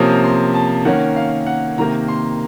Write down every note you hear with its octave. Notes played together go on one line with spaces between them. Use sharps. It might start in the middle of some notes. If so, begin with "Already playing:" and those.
Already playing: C3 F3 A#3 C#4 D#6
A#5
C6
A5
D#3 A#3 C#4 F#5
F5
F#5
C3 D#3 A#3 A#5
C6